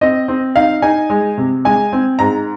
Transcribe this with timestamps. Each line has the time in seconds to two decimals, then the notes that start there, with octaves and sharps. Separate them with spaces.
0.01 C4 D#5
0.28 C4
0.56 D#4 F5
0.82 D#4 G#5
1.10 G#3
1.38 C3
1.65 G#3 G#5
1.93 C4
2.19 G#2 A#5